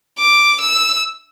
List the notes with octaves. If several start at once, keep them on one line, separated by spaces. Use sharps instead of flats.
D6
E6